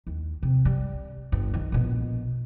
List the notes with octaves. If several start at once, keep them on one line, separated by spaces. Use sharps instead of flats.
D#2
C3
G3
G1 G2
D#3
A#1 B2